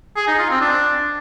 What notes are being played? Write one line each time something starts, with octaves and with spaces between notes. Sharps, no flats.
G#4
D#4
F4
C4
D4